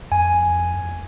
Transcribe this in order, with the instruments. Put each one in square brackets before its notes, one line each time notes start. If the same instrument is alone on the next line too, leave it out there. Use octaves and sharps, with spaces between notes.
[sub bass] F2 [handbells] G#5